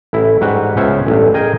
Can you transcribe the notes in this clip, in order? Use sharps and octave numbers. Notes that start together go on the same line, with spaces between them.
A1 E4
G#2 G3 F#4 B4 F#5
C#2 B3 C#4 C5 E5
A1 G2
G#4 A#4 D#5 G5 G#5